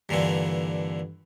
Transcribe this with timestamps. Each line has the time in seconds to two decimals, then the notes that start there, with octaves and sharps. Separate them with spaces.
0.09 G2 A#2 D3 E3